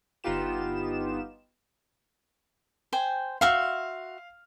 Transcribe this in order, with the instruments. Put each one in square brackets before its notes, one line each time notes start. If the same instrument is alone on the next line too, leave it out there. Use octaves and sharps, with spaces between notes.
[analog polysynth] G1 B3 D#4 F4 G4 E7
[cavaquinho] C5 G5 G#5
[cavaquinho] F#4 E5 C6 [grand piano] F5 F6